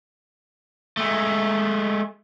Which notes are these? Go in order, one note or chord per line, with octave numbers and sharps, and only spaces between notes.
G#3 A3